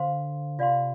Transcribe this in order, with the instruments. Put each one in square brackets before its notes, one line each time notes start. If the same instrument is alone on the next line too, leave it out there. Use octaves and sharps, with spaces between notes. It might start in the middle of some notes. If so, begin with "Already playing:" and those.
Already playing: [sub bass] D3 [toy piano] C5 F5 C6
[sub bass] C3 [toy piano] F4 D5 F5 C6